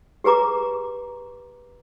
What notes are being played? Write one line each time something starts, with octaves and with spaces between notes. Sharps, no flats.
G4 G#4 B4 A#5 D6